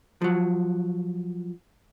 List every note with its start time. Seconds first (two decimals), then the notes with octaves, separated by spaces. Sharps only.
0.22 F3 F#3